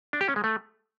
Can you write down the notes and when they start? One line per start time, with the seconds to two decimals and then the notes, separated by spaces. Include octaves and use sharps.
0.13 D4
0.21 G4
0.28 C#4
0.36 G#3
0.44 A3